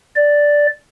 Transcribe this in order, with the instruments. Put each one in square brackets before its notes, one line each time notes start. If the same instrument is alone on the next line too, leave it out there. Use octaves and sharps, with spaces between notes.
[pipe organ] D5